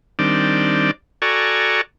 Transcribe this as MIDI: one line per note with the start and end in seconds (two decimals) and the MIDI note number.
0.19 0.91 51
0.19 0.91 55
0.19 0.91 60
0.19 0.91 62
0.19 0.91 74
1.22 1.81 66
1.22 1.81 69
1.22 1.81 74
1.22 1.81 80
1.22 1.81 82
1.22 1.81 85